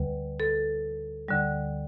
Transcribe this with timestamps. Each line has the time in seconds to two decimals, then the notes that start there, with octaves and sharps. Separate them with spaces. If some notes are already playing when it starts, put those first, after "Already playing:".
Already playing: D2 D3 G3 B4
0.40 A4
1.28 D2 D3 G3